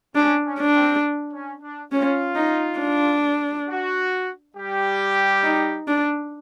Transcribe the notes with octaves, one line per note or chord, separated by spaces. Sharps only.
C#4 D4
C#4
D4
C4
C#4
D4
C#4 F4
D#4
D4
F#4
G3 G4
D#4
D4